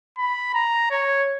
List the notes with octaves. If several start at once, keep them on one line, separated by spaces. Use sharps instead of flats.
B5
A#5
C#5